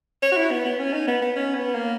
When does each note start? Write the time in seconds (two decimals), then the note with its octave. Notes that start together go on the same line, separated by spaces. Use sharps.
0.22 C#5
0.32 F#4
0.37 E4
0.51 B3
0.65 B3
0.79 C#4
0.93 D#4
1.08 B3
1.22 B3
1.36 C#4
1.55 B3
1.74 A#3